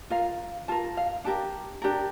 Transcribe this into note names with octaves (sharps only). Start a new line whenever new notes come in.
F4 A#4 F5
F4 A#4 A5
F5
D4 G4 A#4 A5
D4 G4 A#4